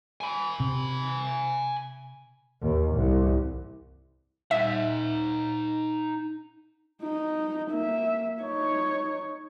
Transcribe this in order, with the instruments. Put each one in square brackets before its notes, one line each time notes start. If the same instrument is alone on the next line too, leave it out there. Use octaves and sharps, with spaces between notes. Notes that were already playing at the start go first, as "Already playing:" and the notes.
[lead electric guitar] G#5 B5
[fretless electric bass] C3
[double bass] D#2
C2
[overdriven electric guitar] D#4 F#5 [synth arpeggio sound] E5
[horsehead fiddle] D#4
A#3 E5
D#4 C#5